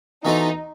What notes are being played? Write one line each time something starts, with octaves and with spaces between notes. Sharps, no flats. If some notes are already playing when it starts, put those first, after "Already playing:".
E3 B3 D#4 F#4 A4 C5